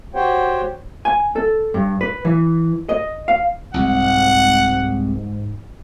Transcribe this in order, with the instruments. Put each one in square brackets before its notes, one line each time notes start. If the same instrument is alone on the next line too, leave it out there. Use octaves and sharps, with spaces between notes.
[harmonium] F#4 G4 C5 C#5 F#5 G5
[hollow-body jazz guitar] G#5
A4
G2
B4
E3
D#5
F5
[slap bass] C2 [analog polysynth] G#2 [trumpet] F#5